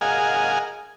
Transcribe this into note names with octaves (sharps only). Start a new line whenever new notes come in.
G#4 A#4 D#5 F5 F#5 G#5